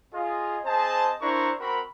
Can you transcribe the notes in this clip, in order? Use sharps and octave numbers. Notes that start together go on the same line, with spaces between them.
F4 G#4 D#5
C4 G#4 C5 D#5 A5
D4 E4 A#4 C5 A#5 C#6
C4 F#4 A#4 B5